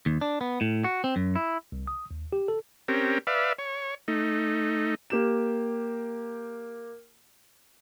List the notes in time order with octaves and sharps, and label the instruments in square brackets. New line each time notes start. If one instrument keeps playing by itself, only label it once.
[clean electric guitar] D#2
D4
B3
A2
F#4
C4
F#2
E4
[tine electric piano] C2
D#6
D#2
G4
A4
[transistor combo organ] C4 C#4 G4 A#4
B4 D5 E5 F5
C#5
A3 D#4
[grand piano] A#3 G4 E7